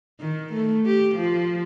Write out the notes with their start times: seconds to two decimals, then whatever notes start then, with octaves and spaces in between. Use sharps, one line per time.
0.20 D#3
0.53 A3
0.86 G4
1.16 F3